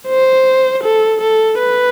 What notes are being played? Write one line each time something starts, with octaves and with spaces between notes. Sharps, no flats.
C5
A4
A4
B4